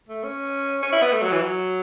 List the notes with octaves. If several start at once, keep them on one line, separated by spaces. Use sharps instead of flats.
A3
C#4
C#4
E4
B3
A3
F#3
E3
F#3